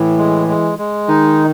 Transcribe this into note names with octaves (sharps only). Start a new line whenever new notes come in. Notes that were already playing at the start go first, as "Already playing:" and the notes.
Already playing: A2 E3
G#3
G#3
G#3
D#3 D#4